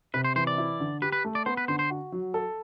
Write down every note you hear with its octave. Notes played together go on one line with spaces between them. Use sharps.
C3 B4
C5
E3 C5
D5
E4
D3
G4 B4
B4
A3
D5
B3 C5
B4
D3 C5
C5
F#4
F#3
A4